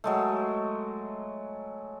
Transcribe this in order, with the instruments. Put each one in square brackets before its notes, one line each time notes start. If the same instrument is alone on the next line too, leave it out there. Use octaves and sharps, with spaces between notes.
[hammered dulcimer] F#3 G#3 A3